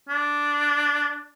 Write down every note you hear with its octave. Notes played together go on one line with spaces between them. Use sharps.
D4